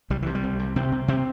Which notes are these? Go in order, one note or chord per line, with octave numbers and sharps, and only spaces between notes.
C2 G3
C3 E3
G3
C2
C3
C3 C4
C3
C3 C4